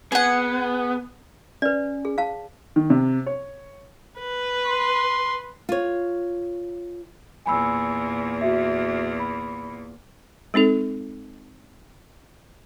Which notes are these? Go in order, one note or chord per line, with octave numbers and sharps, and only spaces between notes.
B3 G#4 F#5
C#4 B4 D5
G#4
F5 A5
D#3
C3
C#5
B4
C6
F4 C#5
E2 A#2 G#5 B5 E6
F#4 E5
B5
G#3 C4 D#4 A4